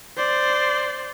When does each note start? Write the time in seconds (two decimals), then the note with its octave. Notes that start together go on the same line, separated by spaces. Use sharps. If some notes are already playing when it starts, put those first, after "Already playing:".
0.17 C5 D5